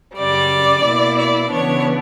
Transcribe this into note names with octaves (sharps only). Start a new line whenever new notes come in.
F#2 C#3 G3 D5
B2 A#3 E4
D5
C#3 E3 B3 D4 C#5